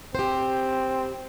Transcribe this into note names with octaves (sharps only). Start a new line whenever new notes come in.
C4 G4 C5